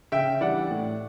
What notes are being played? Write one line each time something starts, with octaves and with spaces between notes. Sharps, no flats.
C#3 E5 G5
E3 G3 D4 D5 F#5
A2